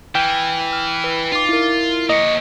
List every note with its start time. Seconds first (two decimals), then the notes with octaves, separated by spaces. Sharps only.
0.15 E3 G5 F6
0.73 F6
1.04 B4
1.32 D#4 F4 D6
1.49 E4 A#4
2.10 A#3 C#5 D#5